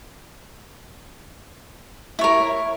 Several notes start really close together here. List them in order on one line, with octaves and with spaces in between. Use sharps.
E4 C#5 A#4